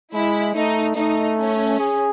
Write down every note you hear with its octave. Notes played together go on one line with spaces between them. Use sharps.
G#3 E4
A3 D#4
A3 D#4
C#4
G#4